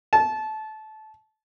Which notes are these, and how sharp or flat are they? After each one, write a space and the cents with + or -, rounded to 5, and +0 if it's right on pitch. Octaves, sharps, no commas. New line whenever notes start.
A5 -20